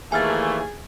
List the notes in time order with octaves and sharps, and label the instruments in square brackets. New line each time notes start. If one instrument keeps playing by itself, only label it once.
[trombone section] D#2 E3 A#3 [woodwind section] A3 [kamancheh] G#4 [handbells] G#5 F6 A6